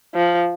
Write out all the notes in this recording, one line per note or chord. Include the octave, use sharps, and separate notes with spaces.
F3